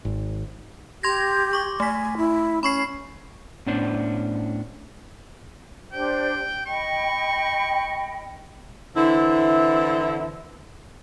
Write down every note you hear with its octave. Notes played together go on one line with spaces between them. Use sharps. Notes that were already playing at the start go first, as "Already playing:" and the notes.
G#1
G4 C6 G#6 A#6
C#6 D6
A3 G#5 B6
E4
C#4 B5 C#6 C7
A2 B3 C#4 D4 C5 D5
D4 G4 C5 G5
D#5 G5 B5 C#6
D3 E3 C4 E4